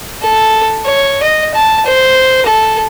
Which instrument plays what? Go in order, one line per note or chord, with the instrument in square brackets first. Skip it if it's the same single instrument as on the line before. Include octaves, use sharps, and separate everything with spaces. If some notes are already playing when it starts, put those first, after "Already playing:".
[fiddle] A4
C#5
D#5
A5
C5
A4